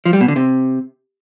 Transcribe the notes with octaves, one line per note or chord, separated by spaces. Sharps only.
F3
G3
B2
D3
C3